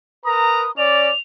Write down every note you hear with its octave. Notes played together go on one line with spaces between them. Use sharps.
A#4 B4 A#5 D#6
C#4 D5 F7